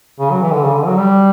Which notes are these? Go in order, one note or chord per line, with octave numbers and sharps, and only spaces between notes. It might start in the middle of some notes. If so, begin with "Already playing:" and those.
C#3
F#3
E3
D3
C#3
D3
F#3
G3